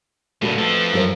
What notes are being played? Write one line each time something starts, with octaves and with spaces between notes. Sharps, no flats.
C#2 A#2 A3 F#4 B4
F3 A4
F#2 G4 C5